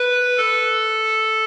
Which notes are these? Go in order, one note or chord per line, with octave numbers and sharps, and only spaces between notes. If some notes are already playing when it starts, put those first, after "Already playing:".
Already playing: B4
A4